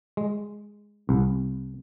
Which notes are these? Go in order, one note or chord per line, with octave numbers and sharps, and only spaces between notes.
G#3
C2